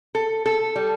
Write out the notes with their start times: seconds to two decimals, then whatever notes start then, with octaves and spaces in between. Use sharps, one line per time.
0.15 A4
0.46 A4
0.76 G3